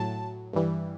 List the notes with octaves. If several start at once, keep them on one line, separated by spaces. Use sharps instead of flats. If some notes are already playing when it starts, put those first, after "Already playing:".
Already playing: A2 F#3 A5
G2 E3 G3